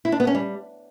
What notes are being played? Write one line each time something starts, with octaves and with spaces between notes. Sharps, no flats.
E4
D4
B3
C#4
G3